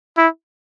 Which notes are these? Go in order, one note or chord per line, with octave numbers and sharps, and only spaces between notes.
E4